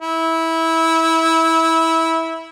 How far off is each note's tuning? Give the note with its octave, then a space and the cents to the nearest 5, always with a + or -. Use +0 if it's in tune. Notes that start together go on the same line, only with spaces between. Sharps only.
E4 -15